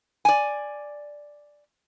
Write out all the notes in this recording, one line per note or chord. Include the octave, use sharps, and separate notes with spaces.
D5 G#5